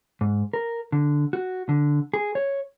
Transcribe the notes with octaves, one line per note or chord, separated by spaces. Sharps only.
G#2
A#4
D3
F#4
D3
G#4
C#5